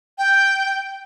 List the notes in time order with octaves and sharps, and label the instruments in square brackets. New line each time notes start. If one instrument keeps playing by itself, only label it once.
[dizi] G5